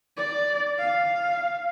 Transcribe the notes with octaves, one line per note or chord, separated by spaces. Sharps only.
D5
F5